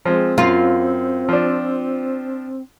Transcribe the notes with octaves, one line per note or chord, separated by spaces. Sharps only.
F3 G#3 C4
F#2 F4
F3 D4